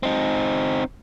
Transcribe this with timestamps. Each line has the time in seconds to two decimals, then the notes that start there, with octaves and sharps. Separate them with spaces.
0.03 C4 D#4